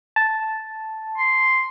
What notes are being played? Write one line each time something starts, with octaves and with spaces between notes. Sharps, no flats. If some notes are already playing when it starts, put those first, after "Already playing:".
A5
C6